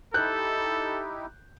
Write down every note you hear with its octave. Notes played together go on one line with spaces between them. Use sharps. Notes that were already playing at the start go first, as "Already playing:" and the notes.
D#4 E4 G4 A4 F#6 G6